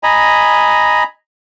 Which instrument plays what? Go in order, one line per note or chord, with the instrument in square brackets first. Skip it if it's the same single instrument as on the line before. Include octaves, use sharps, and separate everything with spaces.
[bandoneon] D#5 G#5 A#5 B5